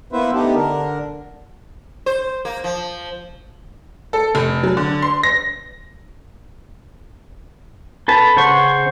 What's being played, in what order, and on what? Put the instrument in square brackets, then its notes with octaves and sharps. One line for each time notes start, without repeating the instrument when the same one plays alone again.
[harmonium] A#3 B3 E4 B4 C5 E5
A3 B3 D4 D#4 G4
D3 D4 A#4
[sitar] C5
A#3
F3
[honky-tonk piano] A4
F1
F#3
D3
C6
A#6
[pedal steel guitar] A4 B4 A5
C#3 C5 F#5 C#6